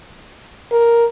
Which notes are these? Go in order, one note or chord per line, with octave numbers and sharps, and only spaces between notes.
A#4